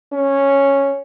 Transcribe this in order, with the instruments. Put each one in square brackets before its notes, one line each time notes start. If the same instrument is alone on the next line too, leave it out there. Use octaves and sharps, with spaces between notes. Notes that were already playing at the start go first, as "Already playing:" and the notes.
[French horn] C#4